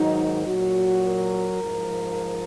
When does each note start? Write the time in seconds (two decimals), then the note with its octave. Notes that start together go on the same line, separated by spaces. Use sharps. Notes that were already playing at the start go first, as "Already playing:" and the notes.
Already playing: G#2 D#3 F#3 D#4
0.46 A#2 F#3 F#4
1.04 A#4
1.63 G#2 F3